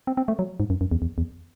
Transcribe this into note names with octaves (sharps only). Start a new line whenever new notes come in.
C4
C4
A3
F#3
G#2
F#2
F#2
E2
E2
E2